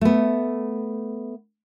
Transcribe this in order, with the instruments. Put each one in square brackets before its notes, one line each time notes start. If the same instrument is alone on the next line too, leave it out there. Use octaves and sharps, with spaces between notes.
[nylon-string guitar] A3 B3